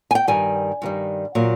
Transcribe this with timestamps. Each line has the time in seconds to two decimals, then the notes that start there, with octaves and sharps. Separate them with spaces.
0.11 G#5
0.15 G5
0.27 G2 D#3 G3 G#5
0.82 G2 D#3 G3
1.35 A#2 F#3 A#3